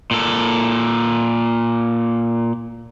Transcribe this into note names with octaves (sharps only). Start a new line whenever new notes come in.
A#2 A4